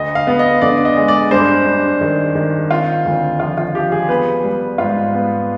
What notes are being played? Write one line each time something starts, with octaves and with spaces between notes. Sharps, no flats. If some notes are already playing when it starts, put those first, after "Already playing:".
Already playing: D2 D#5
F5
B3
D#5
D3 D5
D5
D#5
G#3
D5
G2 C5
G2
D#3
D#3
C4 F4
D2
F3 F4
F4
F3 G4
G#4
B3 B4
G3
G#2 F4
B3